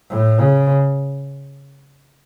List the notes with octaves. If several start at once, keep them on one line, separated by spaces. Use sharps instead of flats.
A2
C#3